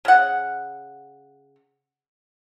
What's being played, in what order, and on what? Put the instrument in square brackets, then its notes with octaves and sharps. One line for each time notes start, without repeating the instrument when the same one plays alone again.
[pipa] C#3 F#5